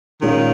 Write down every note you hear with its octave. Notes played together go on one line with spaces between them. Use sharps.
A#2 D#3 G#3 C#4 F4